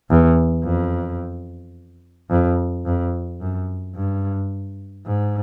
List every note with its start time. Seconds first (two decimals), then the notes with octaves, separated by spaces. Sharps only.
0.10 E2
0.64 F2
2.30 F2
2.86 F2
3.41 F#2
3.95 G2
5.06 G#2